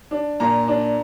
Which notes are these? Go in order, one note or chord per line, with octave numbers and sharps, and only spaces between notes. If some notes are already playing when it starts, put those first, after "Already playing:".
D4
A#2 A#5
D4